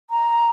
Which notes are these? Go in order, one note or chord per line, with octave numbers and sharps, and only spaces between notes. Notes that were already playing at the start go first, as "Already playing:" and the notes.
A#5